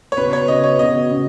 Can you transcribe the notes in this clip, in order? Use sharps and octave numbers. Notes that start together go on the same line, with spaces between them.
C#5
C#3 B3 F#4 B4
C#5
C#3 B3 F#4 D#5
C#5
C#3 B3 F#4 D#5
C#3 B3